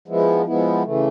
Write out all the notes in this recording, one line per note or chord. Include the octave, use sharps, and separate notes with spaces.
F3 G#3 B3 E4
F3 G#3 B3 E4
C#3 E3 A3